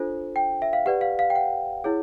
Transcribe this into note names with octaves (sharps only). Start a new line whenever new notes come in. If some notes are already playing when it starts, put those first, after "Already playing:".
Already playing: D4 F4 A4 C5
G5
E5
F5
G4 B4 D5 F#5
F5
F5
G5
F#5
E4 G#4 C#5